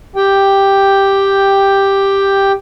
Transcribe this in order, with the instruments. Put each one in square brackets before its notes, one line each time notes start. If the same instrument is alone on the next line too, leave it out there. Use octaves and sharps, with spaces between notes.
[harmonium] G4 G5